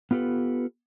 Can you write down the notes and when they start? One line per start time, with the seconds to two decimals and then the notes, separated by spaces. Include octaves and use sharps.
0.11 B3 F4 G4 A4 B4